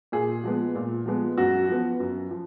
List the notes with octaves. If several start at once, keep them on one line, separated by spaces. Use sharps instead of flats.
A#2 G#4
F3 G#3 B3
A#2
F3 G#3 B3
F#2 F#4
F3 B3
F#2
F3